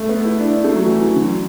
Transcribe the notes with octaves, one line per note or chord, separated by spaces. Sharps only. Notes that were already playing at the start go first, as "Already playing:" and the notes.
Already playing: A3
B3
E4
D4
A3
F#3
E3
F#3
D3